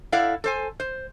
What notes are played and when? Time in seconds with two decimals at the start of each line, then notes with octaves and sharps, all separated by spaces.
0.12 E4 A4 D5 F5 F#5
0.44 A4 C5 G#5
0.80 C5